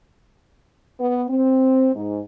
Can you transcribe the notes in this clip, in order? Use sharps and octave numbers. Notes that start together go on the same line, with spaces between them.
B3
C4
G#2